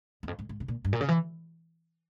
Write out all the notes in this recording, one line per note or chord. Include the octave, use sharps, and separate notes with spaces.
E2
F2
G#2
G#2
C3
A#2
G2
A#2
C#3
E3